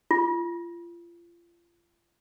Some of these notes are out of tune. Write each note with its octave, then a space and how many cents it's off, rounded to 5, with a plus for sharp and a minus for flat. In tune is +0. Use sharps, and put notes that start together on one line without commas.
F4 -30